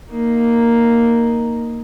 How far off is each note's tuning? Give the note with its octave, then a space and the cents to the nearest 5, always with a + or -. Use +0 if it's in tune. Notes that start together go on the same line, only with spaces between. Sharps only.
A#3 +0 D#4 +0